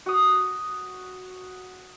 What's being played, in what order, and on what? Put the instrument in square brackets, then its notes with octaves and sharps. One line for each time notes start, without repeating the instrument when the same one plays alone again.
[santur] F#4 D#6